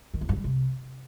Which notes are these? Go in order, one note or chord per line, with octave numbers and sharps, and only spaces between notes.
D#3
E2
G2
G3
C3